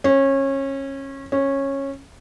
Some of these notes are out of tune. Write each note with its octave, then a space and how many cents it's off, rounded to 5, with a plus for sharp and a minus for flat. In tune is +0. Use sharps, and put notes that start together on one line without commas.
C#4 -25
C#4 -15